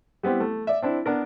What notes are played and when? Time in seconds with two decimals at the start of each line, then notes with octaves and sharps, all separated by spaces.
0.23 G3 B3 C4 E4 G4
0.40 A3
0.67 D5 E5
0.82 C4 D4 E4
1.06 B3 D4 A#4